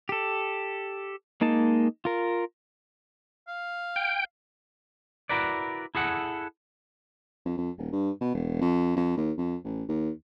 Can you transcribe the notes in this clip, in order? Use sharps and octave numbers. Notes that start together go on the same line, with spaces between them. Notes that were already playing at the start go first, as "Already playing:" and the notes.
G4 A4
G#3 A#3 D#4 A5
F4 A#4
F5
G5
E4 F#4 A#4 B4 D5
E4 G#4 A4 F#5
F2
F2
D#1
G2
B2
E1
F2
F2
D#2
F2
A1
D#2